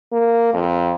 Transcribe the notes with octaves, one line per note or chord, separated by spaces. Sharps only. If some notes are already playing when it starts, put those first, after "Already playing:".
A#3
F2